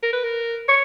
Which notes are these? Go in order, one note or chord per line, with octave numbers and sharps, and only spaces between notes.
A#4
B4
A#4
C#5